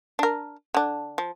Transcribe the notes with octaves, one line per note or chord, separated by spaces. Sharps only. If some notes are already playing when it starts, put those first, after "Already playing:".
D4 A#4
D3 D4
F3